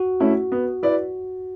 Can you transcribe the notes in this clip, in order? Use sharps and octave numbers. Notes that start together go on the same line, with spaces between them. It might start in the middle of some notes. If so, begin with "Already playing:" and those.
Already playing: F#4
A3 C#4 E4
B3
E4 B4 D5